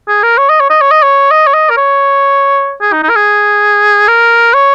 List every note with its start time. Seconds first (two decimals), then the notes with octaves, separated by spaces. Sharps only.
0.08 G#4
0.23 A#4
0.38 C#5
0.50 D#5
0.60 C#5
0.70 D#5
0.81 C#5
0.91 D#5
1.03 C#5
1.31 D#5
1.47 C#5
1.54 D#5
1.69 A#4
1.77 C#5
2.81 G#4
2.92 D#4
3.03 D#4
3.09 A#4
3.15 G#4
4.08 A#4
4.54 C#5